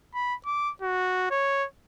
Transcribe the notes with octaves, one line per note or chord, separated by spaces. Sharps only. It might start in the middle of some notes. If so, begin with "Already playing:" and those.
B5
D6
F#4
C#5